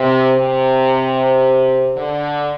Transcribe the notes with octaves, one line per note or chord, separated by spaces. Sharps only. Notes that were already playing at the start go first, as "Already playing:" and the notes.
Already playing: C3
C3
D3